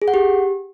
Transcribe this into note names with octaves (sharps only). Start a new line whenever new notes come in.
G#4
F#5
G4